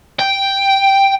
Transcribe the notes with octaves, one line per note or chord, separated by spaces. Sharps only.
G5